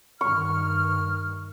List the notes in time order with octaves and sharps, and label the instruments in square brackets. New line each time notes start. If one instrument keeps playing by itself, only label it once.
[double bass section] G2 D#3 [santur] C#6 [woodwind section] F6